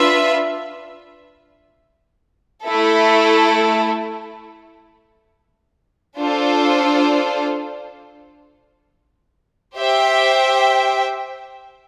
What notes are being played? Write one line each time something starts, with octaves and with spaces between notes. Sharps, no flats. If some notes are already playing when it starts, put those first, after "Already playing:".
Already playing: D4 F4 B4 E5
A3 E4 A4
D4 F4 A4 C5
G4 C5 E5 G5